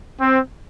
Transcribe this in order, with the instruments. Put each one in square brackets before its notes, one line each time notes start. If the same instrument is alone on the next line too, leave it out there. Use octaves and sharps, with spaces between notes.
[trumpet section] C4